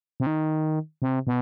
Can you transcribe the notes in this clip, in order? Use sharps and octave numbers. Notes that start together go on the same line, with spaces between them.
C3
D#3
C3
B2